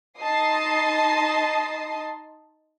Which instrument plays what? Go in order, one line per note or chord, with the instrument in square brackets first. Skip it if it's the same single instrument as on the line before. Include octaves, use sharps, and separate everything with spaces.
[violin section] D#4 D#5 A5 C6 D#6 C7